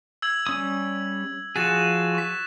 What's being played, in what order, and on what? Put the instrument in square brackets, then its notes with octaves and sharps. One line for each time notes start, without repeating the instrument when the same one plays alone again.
[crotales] E6 G#6 F#7
[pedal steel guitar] G3 C#4 D#6
[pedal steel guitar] F3 F#4 G#4 [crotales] F#6 A6 E7
[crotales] C#6 B6